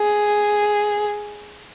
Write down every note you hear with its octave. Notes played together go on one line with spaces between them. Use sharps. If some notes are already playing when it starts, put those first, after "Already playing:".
Already playing: G#4